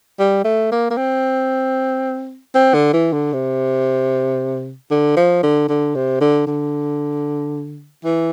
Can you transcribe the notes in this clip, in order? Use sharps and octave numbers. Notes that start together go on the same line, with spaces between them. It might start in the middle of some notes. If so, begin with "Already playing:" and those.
G3
A3
A#3
A#3
C4
C4
D3
E3
D3
C3
D3
F3
D3
D3
C3
D3
D3
E3